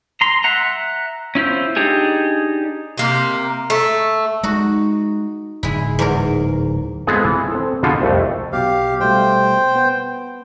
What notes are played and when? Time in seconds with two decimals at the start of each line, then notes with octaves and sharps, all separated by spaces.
0.21 A#5 C6
0.44 E5 F#5 A#5
1.35 C#4 E4 F4 C5
1.76 D4 D#4 G4 G#4
2.98 C3 A#3 G4
3.70 A3
4.43 G#3 D#4 F#4
5.63 D1 G#3 E4
5.99 E2 G#2 A#4
7.07 G#3 B3 C4 F4 G#4 A4
7.25 E3
7.52 C4 A4
7.83 B2 D3 F3 F4 G#4 A4
8.02 C2 F2 A3
8.52 B1 B2 G4 F5 D6
9.00 B2 G3 A3 C5 G5
9.76 B3